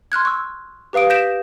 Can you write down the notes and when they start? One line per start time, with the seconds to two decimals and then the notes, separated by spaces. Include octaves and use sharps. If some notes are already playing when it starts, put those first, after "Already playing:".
0.12 C6 F6 F#6 G#6
0.25 C#6 E6
0.93 G4 B4 F5 D#6 D7
1.10 G6 A#6 B6 D7 E7